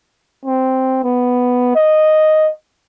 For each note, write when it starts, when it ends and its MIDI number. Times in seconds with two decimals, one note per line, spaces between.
0.45 1.01 60
1.04 1.75 59
1.76 2.51 75